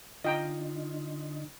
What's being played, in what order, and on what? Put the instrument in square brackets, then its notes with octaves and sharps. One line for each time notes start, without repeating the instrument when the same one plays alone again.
[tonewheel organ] D3 D#4 [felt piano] F4 [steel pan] D#5 G5 A#5